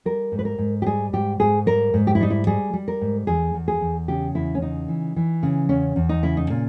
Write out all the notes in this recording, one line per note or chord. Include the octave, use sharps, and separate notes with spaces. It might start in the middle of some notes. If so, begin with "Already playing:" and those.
G3 A#4
G#2
B4
A#4
G#2
G4
G3 G#4
G#2 G4
G#2 G#4
G3 A#4
G#2
G4
E4
G3 D#4
E4
G3 G#4
G3
A#4
G#2
E2 G#4
E2
G#4
E2
C#3 G4
E2 E4
C#4
C#3 D#4
E3
E3
C#3
E2 C#4
E2
D#4
C#3 E4
D#4
A#2